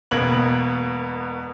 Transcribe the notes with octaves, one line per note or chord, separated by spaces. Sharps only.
E1 B2 A#3 B3 G#6 F#7